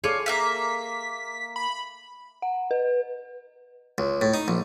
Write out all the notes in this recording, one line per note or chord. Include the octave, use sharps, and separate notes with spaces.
F4 G#4 A4 C#5 D5
A#3 E5 F5 B6
B5
F#5
B4
C#2
A2
D#4
A#1